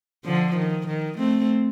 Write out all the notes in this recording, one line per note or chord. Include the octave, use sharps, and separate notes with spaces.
D3 F3
D#3
D#3
A3 C4